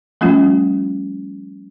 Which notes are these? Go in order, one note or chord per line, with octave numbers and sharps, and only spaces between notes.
F3 G3 A3 C#4 F4